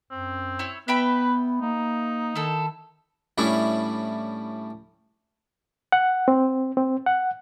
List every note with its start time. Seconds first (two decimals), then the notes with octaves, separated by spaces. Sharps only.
0.11 F#2 C4
0.59 E4 C#5
0.88 B3 B4 E5 G5 B5
1.62 A#3 D#4
2.36 D#3 E4 A4
3.38 A2 G3 C#4 D4 E4
5.92 F#5
6.28 C4
6.77 C4
7.06 F#5